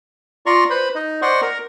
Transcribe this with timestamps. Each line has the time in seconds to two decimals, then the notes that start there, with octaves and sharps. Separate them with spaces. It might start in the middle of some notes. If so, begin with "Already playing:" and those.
0.46 F4 D5 A#5 C6 C#6
0.70 B4 C5 B5
0.95 D#4 D#5
1.22 C5 D5 D#5 F#5 C6 C#6
1.42 A#4 A#5